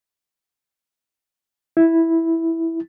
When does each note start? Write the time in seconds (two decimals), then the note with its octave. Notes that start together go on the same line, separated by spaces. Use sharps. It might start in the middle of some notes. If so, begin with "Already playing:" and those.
1.77 E4